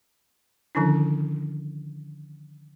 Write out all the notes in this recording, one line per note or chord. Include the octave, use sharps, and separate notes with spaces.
D3 D#3 F3 C#4 D4 E4